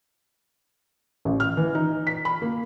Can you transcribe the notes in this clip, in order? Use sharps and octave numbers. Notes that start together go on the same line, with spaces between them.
A1
F6
E3
D#4
B6
B5
A#3